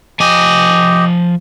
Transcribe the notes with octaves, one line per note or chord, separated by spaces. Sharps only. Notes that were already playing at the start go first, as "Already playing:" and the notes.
F3 G4 D#5 G#5